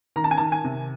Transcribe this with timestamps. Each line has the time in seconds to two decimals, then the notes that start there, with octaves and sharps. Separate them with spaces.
0.16 D#3 A#5
0.24 A5
0.31 G#5
0.38 D#3 A5
0.52 G#5
0.64 C3